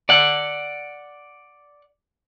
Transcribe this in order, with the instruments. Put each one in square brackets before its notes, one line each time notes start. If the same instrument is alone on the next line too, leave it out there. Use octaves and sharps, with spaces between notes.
[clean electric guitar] D5 F#5